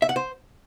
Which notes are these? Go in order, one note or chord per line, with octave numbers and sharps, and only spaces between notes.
E5
F#5
C5